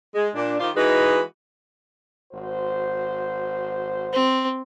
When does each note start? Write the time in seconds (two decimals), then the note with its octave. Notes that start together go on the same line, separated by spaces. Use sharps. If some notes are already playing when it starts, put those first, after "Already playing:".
0.15 G#3
0.35 A#2 D4
0.59 D#3 F4 G4 C5
0.76 E3 G#3 D#4 F#4 B4
2.32 G#1 F#4 C5
4.13 C4